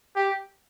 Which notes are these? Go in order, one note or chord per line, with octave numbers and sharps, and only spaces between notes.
G4